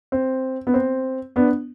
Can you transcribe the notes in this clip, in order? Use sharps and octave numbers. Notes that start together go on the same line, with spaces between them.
C4
B3
C4
B3 D4